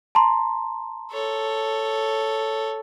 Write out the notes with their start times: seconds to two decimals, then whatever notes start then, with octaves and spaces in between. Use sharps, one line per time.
0.15 A5 A#5 C6
1.12 A4 C#5